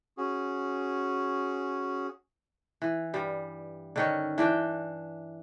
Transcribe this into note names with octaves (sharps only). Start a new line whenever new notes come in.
C#4 F#4 G#4
E3
G2 G3
D3 D#3 C#4
E3 D4 G5